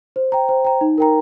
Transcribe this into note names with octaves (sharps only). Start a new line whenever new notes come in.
C5
G5 A#5
C5
G5 A#5
D#4
A#4 G5 A#5